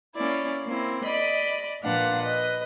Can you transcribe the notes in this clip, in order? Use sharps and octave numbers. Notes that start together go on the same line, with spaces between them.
A#3 C#4 E4 D5
A#3 C4 E4
D5 D#5 B5
A#2 F3 D4 B4 F5 F#5
B4 D#5